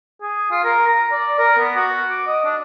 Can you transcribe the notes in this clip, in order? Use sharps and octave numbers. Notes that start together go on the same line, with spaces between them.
G#4
F4
A#4
A#5
D5
A#4
B3
F#4
D6
D#5
D4